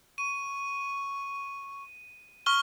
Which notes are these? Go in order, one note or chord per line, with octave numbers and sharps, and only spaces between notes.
C#6 D#7
C#6 F6 G7